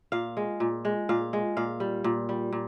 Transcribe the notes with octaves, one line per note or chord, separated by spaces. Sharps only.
A#2 F5
G#3
A#2
G#3
A#2 F5
G#3
A#2 F5
G3
A#2
G3
A#2